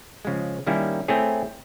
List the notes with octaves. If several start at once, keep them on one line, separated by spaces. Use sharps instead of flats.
C#3 F3 G#3
D#3 G3 A#3 C#4 E4
A3 C4 E4 G#4 C#5